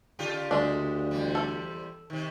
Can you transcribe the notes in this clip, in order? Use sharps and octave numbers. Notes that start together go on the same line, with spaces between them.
C#3 F4 G4
D2 G#3 D4
E2 C3 G3
A4
C3 D#3